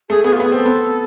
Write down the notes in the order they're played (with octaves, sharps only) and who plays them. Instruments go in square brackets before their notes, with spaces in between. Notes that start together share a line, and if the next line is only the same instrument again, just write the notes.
[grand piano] A3 [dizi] G#4
[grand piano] B3 [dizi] G#4
[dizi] F4
[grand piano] B3 [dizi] G#4
[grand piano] C4 [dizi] A4
[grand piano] B3